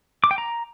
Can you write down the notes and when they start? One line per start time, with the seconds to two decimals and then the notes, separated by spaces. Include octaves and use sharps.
0.24 D6
0.31 G5
0.38 A#5